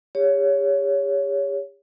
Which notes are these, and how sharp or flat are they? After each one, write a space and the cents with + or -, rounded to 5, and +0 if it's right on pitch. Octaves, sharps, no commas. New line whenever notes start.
G4 +45 C#5 +15